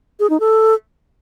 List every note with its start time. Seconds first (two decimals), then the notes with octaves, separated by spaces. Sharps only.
0.20 G#4
0.30 D#4
0.40 A4